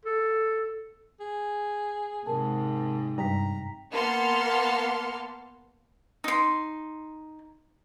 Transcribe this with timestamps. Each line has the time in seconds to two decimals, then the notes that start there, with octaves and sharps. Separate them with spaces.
0.05 A4
1.20 G#4
2.26 G#2 C3 A#4 A5
3.18 G2 G5 A#5 B6
3.91 A#3 B3 A5 C6 F6 C#7
6.24 D#4 C6